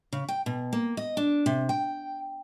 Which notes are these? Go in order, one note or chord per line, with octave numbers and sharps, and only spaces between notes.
C#3
G5
B2
A#3
D#5
D4
C3
G5